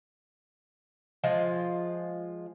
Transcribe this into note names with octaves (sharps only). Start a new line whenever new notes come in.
F3 G#3 F4